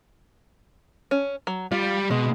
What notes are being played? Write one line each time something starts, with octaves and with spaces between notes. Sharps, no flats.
C#4
F#3
G3 F4
B2 G#3